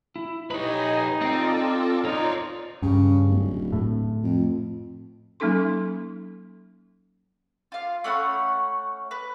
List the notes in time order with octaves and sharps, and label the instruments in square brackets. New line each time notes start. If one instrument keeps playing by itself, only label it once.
[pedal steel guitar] E4
[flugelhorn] D#4 [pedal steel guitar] G4 B5 [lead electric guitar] B4 C#5 [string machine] D#5 G#5
[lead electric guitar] C4 [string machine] F4 A4 D5 [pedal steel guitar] D#5 G5
[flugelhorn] D#4 [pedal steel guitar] F4 A#5 [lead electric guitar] C#5 D5 [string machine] C6
[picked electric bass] G2 [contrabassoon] C#3
[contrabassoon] D1
[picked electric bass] A2
[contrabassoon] F2
[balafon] F#3 A#3 C#4 D#4 A4 C6
[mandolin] F4 F5
A3 C#4 F#5 B5
B4